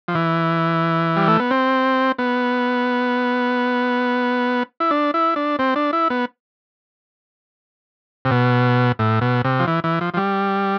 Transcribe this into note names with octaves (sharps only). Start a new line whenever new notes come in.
F3
E3
G3
A3
B3
C4
B3
E4
D4
E4
D4
C4
D4
E4
B3
C3
B2
A2
B2
C3
F3
E3
E3
F3
F3
G3